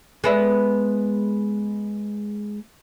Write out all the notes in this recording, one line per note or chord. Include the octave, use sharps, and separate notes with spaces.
G#3 B3 E5